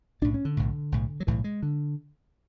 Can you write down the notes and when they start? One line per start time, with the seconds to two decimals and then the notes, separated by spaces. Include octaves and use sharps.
0.22 B1 A2 D4
0.34 C#4
0.45 D3
0.57 B1 A2
0.92 B1 A2
1.20 F#3
1.27 B1 A2 E3
1.44 G#3
1.63 D3